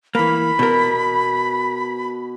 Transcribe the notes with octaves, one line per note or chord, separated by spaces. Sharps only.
E3 A#3 B5
B2 A#4